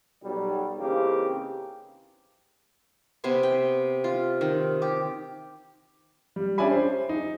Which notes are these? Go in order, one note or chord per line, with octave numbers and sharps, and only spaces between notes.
B1 F#3 G3
C#3 E3 A#3 C4 D#4 G4
C3 B3 G#5 C6
G5
F4
D#3
G4
G3
C#4 D4 G4 E5 G#5 B5
C5
D#4